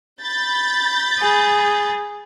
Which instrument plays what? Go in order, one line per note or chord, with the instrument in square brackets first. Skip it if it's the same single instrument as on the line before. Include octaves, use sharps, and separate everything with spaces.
[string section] B5 G6 A6
[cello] G#4